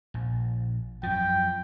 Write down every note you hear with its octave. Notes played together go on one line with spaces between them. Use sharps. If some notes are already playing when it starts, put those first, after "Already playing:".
A#1
F#2 F3 G5